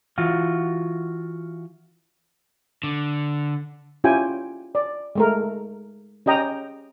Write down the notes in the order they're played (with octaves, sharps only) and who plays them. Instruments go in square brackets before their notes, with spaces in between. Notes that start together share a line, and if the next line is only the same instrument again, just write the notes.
[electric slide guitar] E3 F4 F#4
[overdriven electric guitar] D3
[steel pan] C#4 E4 F4 G4 G5 G#5
D5
G#3 A3 A#4
C#4 G4 D#5 G5 A#5